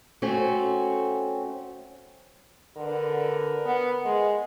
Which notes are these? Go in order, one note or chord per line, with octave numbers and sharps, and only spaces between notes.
A3 C4 C#4 F#4
D3 A#4 B4
B3
G#3